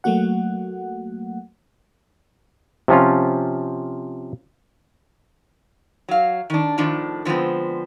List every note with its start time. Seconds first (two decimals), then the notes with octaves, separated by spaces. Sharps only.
0.04 F#3 A3 A#3 F#4 F#5
2.88 C3 F3 C#4 F4
6.09 F#3 F5
6.50 D#3 D4
6.78 A2 D#3 F3 D4
7.25 D3 F3 G#3 B3 C4